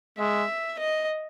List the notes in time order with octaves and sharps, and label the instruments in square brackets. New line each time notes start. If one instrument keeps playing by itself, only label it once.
[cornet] G#3 [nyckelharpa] E5
[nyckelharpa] D#5